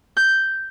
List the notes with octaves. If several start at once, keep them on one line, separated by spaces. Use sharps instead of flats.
G6